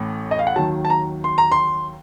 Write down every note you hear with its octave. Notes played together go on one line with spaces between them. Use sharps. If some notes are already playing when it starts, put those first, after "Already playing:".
Already playing: A1 A2
D#5
F5
F#5
D#2 D#3 F#3 A5
A5
A#5
C6
A#5
C6